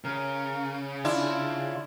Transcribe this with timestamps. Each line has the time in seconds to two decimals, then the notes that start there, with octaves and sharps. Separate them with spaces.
0.04 C#3 A#4
1.05 D4 E4 F4